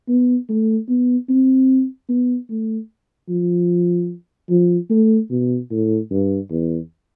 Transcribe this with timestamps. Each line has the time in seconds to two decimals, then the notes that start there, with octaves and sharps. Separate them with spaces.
0.09 B3
0.49 A3
0.89 B3
1.29 C4
2.09 B3
2.50 A3
3.29 F3
4.50 F3
4.90 A3
5.31 B2
5.71 A2
6.11 G2
6.50 E2